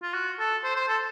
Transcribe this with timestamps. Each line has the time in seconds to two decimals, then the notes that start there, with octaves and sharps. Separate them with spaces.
0.02 F4
0.14 F#4
0.39 A4
0.64 C5
0.76 C5
0.88 A4